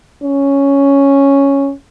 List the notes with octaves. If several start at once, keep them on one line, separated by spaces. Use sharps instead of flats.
C#4